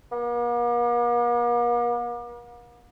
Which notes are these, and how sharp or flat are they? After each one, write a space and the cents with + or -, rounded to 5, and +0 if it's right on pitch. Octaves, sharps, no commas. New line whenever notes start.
A#3 +45